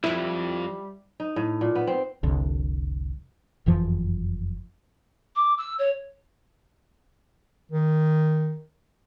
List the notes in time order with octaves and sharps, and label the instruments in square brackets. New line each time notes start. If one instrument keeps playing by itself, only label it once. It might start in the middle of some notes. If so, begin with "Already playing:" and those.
[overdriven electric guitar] B1 F2 [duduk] G3 [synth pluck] E4
[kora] D#4
A2
A#2
B3
C4
[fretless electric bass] F1 C2 D3
F#1 F2 E3 F3
[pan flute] D6
E6
C#5
[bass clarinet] D#3